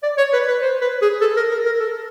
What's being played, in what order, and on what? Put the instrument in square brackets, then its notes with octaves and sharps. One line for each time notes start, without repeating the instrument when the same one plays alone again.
[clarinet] D5
C#5
B4
B4
C5
B4
G#4
A4
A#4
A#4
A#4
A4